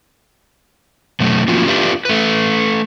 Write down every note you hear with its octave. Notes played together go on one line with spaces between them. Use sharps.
B2 F#3 A3
F3 A#3 C#4 F4 F#4
D4 F4 G4 B4 E5 F5
A3 B4